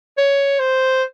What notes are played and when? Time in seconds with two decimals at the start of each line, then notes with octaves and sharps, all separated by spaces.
0.18 C#5
0.59 C5